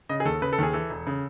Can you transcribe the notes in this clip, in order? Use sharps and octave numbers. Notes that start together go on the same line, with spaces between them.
C#3 D#5
G#4
D#2 A4
C#3 B4
A4
D#2 G#4
E3 A4
E1
C#3